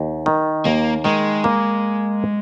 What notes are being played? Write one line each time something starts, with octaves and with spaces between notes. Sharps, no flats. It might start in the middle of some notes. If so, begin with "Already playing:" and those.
Already playing: D#2
D#3
D#2 A#3
D#3 G#3
A#3